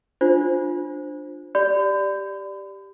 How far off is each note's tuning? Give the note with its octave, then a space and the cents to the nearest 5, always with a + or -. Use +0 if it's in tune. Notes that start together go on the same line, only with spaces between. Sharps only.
D4 +10 F4 +10 C5 +0
G4 +0 D5 +0 B5 +40